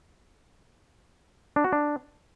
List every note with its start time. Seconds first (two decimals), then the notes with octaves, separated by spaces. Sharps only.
1.56 D4
1.64 F#4
1.73 D4